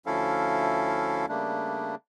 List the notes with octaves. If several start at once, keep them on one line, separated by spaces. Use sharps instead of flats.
D2 F3 C#4 E4 A4 F5
C#3 G3 A3 A#3 D4